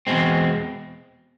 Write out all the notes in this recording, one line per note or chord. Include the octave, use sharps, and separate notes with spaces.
E2 B2 G#3 C4